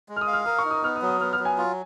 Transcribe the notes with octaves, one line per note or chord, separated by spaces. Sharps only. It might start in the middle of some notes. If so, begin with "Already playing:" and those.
G#3
F6
D#6
F5
F6
A#4 D#6
C#6
D#4
D#6
B3 F6
D#6
F#3
D#6
B3 F6
F6
F#3
G#5
F4